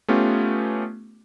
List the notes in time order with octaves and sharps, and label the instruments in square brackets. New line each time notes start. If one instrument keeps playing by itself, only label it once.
[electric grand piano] A3 B3 C#4 F4 G4